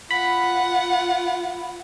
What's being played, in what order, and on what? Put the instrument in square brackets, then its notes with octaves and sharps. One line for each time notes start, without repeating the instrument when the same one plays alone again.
[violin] F4 F#5 [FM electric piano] B5